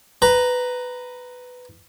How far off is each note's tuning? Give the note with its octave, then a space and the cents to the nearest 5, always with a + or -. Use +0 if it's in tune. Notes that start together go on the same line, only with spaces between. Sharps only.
B4 +10 A#5 +0